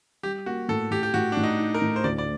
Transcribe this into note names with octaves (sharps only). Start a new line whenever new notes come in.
G3 G4
A#3 F#4
A2 A4
A2 G4
G4
A2 F#4
A2 D4
D#4
D#4
A#4
A2
C5
D2 D5
D5